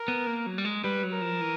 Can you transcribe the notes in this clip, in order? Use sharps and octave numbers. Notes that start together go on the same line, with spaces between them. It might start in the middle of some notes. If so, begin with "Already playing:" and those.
Already playing: A#4
B3
A#3
F#3
G3
G#3
G3 B4
F#3
A#4
F3
E3